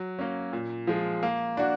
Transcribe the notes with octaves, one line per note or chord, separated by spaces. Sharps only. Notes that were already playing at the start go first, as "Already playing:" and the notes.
Already playing: F#3
A#3 C#4
A#2
F3 G#3
A#3
D4 F#4